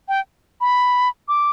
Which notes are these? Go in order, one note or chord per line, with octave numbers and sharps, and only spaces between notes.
G5
B5
D6